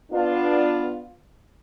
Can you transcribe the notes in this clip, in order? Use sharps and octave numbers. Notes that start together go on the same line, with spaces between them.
B3 D4 F4